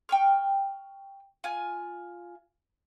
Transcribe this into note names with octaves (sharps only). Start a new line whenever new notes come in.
G5 C#6 F6
F4 G#5